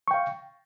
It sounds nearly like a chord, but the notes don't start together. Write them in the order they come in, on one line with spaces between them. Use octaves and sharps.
C#6 G5 F5